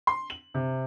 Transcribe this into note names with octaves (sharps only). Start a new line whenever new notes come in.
C6
F#7
C3